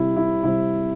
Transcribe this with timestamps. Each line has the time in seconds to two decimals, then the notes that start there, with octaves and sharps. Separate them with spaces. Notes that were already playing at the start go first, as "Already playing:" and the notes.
Already playing: C3 G3 C4 E4
0.17 E4
0.43 C3 G3 C4 E4